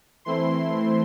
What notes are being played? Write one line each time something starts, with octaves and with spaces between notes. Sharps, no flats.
E3 A3 C4 E4 C6
C6